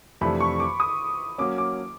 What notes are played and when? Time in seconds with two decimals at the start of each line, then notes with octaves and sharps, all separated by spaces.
0.21 F2 C3 E3 A3 D4 B5
0.40 C#6
0.60 D6
0.80 D#6
1.38 F#3 A#3 C#4 D6
1.58 D6